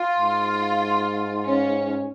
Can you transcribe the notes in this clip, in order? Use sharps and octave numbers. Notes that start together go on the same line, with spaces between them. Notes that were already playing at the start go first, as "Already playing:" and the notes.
Already playing: F4
G#2
C#4